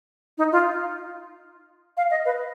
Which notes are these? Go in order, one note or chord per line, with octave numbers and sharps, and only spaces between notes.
D#4
F4
F5
D#5
B4